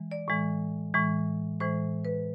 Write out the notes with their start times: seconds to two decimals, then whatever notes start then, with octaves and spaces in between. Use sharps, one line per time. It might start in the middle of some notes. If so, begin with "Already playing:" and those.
Already playing: E3 G#3
0.11 D5
0.28 A2 E3 G#3
0.94 A2 E3 G#3
1.60 A2 E3 G#3 C5
2.05 B4